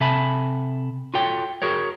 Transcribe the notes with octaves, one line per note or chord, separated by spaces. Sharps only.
C3 A4 E5 G#5 A5 B5
F4 F#4 A4 C#5 G5
F#4 G#4 A#4 C#5